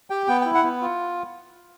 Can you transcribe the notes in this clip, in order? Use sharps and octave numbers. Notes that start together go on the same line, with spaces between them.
G4 G5
B3 G5
G5
E4
F#5
B3
F4